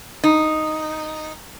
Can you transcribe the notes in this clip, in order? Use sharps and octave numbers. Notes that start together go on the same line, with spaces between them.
D#4